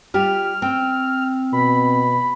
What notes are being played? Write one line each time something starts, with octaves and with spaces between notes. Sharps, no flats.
G3 F4 G4 F6
C4 G5
B2 B5